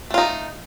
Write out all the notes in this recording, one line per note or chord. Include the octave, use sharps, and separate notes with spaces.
A3 D#4 F4